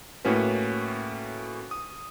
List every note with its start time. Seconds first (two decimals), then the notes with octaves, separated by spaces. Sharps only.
0.25 A2 A#3 C#4 F#4 B4
1.71 D#6